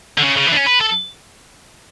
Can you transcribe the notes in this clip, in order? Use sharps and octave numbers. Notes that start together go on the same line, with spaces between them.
D3
C#3
C#3
E3
D4
C#4
B4
A4